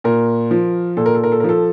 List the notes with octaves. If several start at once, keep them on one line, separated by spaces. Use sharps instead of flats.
A#2 A#4
F3
A#2 A4
A#4
A4
A#4
A4
A#4
F3 A4